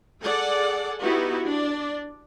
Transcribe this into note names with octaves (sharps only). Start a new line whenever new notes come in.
G#4 A4 D5 F#5
B3 D#4 E4 F#4 G4 B4
D4 D5